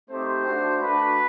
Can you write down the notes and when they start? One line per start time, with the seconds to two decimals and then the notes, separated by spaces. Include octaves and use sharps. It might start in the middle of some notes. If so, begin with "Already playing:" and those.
0.10 A3 C4 D#4 G4 C5
0.46 A3 D4 F#4
0.81 A3 D4 F#4 B4